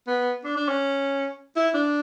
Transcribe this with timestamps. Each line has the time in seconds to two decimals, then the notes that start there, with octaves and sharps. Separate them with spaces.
0.07 B3
0.44 D4
0.57 D4
0.69 C#4
1.56 E4
1.75 D4